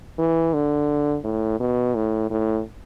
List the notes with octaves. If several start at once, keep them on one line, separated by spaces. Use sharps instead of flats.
E3
D3
A2
B2
A2
A2